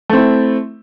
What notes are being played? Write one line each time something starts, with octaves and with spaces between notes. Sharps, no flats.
A3 C4 E4